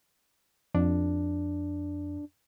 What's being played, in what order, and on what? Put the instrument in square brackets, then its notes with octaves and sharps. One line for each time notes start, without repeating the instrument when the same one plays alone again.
[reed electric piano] F2 [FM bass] D4